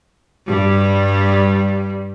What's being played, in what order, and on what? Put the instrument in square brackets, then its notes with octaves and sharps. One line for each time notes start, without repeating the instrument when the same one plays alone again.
[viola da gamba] G2 G3